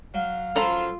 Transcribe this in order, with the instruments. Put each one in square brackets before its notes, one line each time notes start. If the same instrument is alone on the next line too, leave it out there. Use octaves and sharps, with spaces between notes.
[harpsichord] F#3 [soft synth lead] F5
[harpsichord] F#2 F3 [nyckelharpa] F4 [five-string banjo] A4 A#5 B5